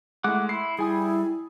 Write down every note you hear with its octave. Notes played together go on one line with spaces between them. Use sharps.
G#3 A3 E4 F#5 D6 F#6
E4 C6 C7
G3 E4 G#4 G#5 D#6